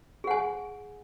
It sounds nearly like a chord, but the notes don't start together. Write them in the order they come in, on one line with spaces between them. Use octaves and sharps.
G#4 F#5 G#5